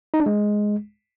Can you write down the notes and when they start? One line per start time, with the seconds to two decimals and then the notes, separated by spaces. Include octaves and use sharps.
0.14 D#4
0.20 D4
0.26 G#3